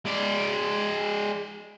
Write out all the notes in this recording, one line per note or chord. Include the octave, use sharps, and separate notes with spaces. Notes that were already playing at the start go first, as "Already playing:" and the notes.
G#3 D5